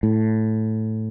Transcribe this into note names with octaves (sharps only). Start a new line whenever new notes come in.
A2